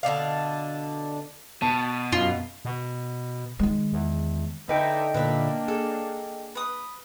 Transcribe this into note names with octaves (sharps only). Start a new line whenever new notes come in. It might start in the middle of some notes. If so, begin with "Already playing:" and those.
B2 D3 D4 F5
B2 A5
F#2 F4
B2
D#3 G#3
E2
D3 D#4 B4 D#5 E5 G5
A#2 D3 A#3 D4 B4 E5
G#4 A4
B4 D#6